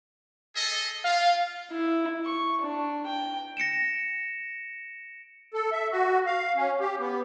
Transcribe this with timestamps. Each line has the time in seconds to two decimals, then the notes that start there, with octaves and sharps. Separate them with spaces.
0.55 G#4 A4 D#5
1.04 F4 F5
1.71 E4
2.26 C#6
2.61 D4
3.07 G5
3.57 A#6 C#7 D7 E7
5.54 A4
5.72 E5
5.92 F#4
6.26 F5
6.57 C#4
6.80 G4
6.99 B3